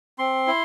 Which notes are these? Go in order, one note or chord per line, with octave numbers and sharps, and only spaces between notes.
C4 C6
E4